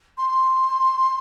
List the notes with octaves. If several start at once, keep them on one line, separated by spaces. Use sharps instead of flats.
C6